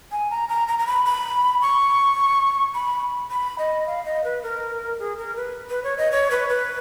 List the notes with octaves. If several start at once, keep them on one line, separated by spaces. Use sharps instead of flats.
G#5
A#5
A#5
A#5
A#5
B5
B5
C#6
B5
B5
D#5
F5
D#5
B4
A#4
G#4
A#4
B4
B4
C#5
D#5
C#5
B4
B4